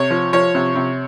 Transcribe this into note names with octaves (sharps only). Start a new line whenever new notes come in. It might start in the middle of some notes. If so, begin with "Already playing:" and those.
Already playing: C3 C#5
F3
F3 C#5
C3
C3